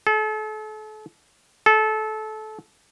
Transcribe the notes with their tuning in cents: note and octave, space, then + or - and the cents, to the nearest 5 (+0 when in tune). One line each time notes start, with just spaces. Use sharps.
A4 -40
A4 -25